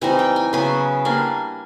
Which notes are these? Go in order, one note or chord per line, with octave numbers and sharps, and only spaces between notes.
E3 G3 C4 D#4 G#5
G5
G#5
C#3 F#3 B3 E4 G#5
G3 A#3 D4 G#5